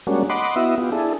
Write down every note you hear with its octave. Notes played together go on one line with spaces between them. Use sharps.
G3 G#3 A#3 C#4 D4 F#4
D#5 F#5 B5 C6 D6
B3 E4 F#4 D#5 E5
B3 F4 G4
D4 E4 G#4 A4